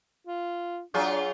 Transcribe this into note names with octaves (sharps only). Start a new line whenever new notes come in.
F4
F#3 D4 F4 G#4